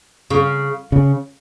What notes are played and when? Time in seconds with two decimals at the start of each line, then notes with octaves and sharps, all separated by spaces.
0.30 C#3
0.92 C#3